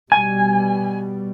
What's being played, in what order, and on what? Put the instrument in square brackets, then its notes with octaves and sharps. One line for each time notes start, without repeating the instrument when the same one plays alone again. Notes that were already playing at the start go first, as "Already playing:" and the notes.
[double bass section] B2 G3 [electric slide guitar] G#5